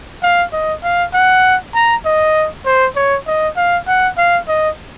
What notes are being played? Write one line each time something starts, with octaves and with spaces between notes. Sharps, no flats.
F5
D#5
F5
F#5
A#5
D#5
C5
C#5
D#5
F5
F#5
F5
D#5